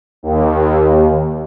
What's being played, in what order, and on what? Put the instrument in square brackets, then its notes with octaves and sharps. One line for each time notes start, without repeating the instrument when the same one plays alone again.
[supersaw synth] D#2